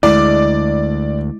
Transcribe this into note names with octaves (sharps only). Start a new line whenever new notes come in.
D2 G#3 E4 D5